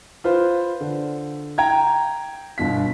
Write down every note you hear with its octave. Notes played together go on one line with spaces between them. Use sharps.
F4 B4 C5
D3
G5 A#5 G#6
G1 B2 B6